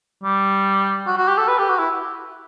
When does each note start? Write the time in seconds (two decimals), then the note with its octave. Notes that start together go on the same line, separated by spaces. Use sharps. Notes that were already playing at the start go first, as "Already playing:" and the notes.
0.23 G3
1.07 F#4
1.17 F#4
1.28 G4
1.38 A4
1.48 B4
1.59 G4
1.69 F#4
1.79 E4